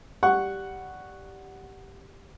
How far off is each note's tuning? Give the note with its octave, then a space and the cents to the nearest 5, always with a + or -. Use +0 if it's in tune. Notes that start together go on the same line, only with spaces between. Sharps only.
G3 +0 F#5 +0 C#6 +0